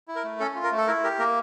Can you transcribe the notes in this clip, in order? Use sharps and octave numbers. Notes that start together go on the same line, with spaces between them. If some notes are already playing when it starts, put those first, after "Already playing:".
E4
A#4
A3
C#4 A4
F4
A#4
A3
A4
E4 A#4
G4 A#4
A#3 A#4